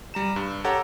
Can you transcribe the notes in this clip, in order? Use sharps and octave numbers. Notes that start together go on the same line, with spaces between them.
G3 A#5 E7
G2
G4 A4 C#5 F#5 A#5